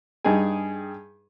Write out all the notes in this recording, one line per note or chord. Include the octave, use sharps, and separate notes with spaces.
G2 D#4 G#4 G#5